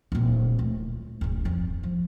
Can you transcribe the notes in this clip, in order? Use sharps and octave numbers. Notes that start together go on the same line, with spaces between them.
D1 A#2
A3
D1 G#1
F2
F3